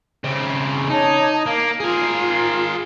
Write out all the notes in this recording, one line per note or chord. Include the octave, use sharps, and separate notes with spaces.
C#3 C4
D#4 C#5 A5 D6
A#3 F5 D6
F4 G#4 A#4